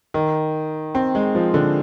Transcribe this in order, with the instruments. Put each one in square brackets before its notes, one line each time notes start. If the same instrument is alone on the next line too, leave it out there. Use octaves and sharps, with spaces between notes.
[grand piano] D#3
C4
G#3
F3
D3